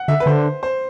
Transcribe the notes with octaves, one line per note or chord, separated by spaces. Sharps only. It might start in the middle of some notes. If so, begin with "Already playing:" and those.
Already playing: F#5
D3 E5
B4
D3 C5
C5